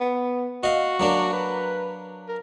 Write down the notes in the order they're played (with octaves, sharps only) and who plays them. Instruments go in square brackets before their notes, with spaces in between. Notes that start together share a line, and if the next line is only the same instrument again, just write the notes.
[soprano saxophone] B3
[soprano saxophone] F#4 [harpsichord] D#5 F5
[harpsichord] F#3 A#3 D4
[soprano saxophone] B4
A#4